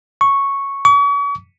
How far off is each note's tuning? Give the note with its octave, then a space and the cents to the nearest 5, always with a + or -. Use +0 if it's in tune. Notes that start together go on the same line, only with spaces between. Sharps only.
C#6 -5
C#6 +40